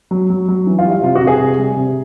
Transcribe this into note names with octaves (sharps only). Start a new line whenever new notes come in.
F#3
F#3
F#3
E3
F4
G3
F4
C3 F4
F#4
C3
G#4
C3
G3
C3